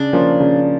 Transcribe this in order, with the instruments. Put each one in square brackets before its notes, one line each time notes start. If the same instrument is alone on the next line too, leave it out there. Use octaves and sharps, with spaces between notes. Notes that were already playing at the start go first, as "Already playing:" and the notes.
Already playing: [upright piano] C#3 [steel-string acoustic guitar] D4
[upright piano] F3 A#3 C#4
C#3